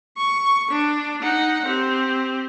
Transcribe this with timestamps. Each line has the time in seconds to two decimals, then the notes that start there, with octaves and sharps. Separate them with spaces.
0.18 C#6
0.71 D4
1.23 D#4 F#5
1.66 C4 G4